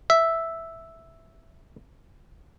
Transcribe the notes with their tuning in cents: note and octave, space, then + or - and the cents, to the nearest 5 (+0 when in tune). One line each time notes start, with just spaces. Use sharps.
E5 +0